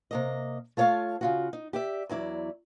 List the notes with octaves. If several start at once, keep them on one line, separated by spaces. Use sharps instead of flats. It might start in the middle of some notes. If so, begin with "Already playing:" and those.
C3 A#3 D#5
A3 F4 C#5 D5 F5 A5
C#3 F4 F#4
D#4
G4 D5 E5
E2 F#3 E4 D5